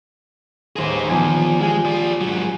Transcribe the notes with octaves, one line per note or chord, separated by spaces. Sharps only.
A1 D#2 G#4 C5 A#5
A#1 E2 F3 G#5
G#3 F4 G4 G#5
F3 D5
G#2 F#3